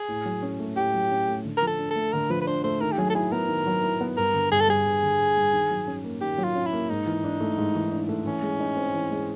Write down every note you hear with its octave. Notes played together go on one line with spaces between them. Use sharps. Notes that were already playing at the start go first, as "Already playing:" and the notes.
Already playing: G#4
A2
F#3
C#4
A3
A2 G4
F#3
C#4
A3
D3
A#4
F3
A4
D4
A4
A3
D3 A#4
F3 B4
B4
D4 C5
A3 C5
D#3 A#4
G4
F#3 G#4
A4
E4 G#4
B3 A#4
D#3
F#3
E4
B3
G2 A#4
D3
G2 G#4
A4
G3 G#4
G2
D3
G2
G3
D#3
F#3
C#4
A#3
D#3 G4
F#3
F4
C#4
E4
A#3
G#2 D#4
E3
D4
A3
G#2
E3
D4
A3
E3 C#4
G#3
D#4
C4
E3
G#3